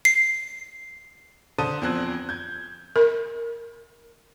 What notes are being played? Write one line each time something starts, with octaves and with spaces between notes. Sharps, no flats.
C7
D3 A4 C5 A5 D#6 D#7
E2 F3 C4 F#6 G#6
G6 G#6
A#4